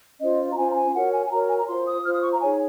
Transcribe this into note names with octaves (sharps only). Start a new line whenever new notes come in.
C#4 F4 C5 D#5
A#5
C#4 F4 C5 G#5
A#5
G#5
F#4 A#4 C#5 F#5
G#5
G#5
F#4 A#4 C#5 A#5
G#5
A#5
F4 C5 C6
D#6
F4 C5 F6
D#6
C#6
A#5
D#4 G#4 C#5 G#5